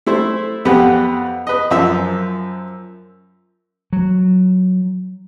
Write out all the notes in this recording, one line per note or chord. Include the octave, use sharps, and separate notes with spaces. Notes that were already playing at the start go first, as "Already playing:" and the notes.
A3 E4 C5
F2 B3 G4 B4 F#5 B5
B4 D#5
F#2 F3 E5
F#3